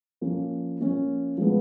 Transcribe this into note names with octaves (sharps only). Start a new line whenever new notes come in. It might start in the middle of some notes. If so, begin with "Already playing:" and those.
F3 A#3 C#4
F3 A#3 C#4
F3 G#3 B3